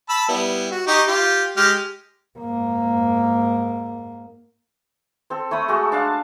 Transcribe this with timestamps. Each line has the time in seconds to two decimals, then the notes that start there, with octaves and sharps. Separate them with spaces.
0.09 A5 B5 E6
0.29 G3 B3 E4
0.71 F#4
0.87 D#4 G4 C#6
1.08 F4 G4
1.57 G#3 G4 F6
2.39 G#2 A#3
5.30 C4 A4
5.51 A3 C#5 B5 D#6
5.68 G#3 A3 F#4 A4
5.92 D4 F5 A5